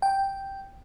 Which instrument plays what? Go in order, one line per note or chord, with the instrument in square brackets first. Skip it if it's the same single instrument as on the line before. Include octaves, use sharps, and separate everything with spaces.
[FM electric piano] G5